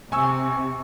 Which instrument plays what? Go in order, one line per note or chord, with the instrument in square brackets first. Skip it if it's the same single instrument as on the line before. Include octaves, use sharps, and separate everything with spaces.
[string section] C3 [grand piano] G#5 C#6 E6